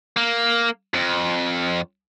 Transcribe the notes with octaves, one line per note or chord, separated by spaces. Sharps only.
A#3
F2